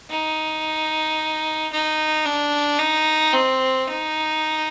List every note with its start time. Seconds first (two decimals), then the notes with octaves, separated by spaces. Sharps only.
0.10 D#4
1.72 D#4
2.26 D4
2.79 D#4
3.33 C4
3.87 D#4